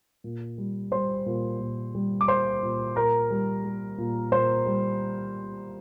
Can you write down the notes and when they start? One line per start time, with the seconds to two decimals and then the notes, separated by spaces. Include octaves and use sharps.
0.24 A#2
0.58 G3
0.92 G3 C5 C6
1.26 A#2
1.60 A#2
1.95 G3
2.21 D6
2.28 G3 C5 C6
2.63 A#2
2.96 A#2 A#4 A#5
3.30 G3
3.64 G3
3.98 A#2
4.32 A#2 C5 C6
4.66 G3